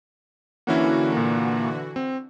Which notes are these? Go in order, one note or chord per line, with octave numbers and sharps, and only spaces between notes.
D3 E3 A#3 C#4 E4 F#4
A#2 A#3
C4